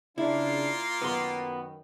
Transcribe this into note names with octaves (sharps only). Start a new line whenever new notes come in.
C#3 A#3 D4 E4 F4
F#2 D#3 B3 C6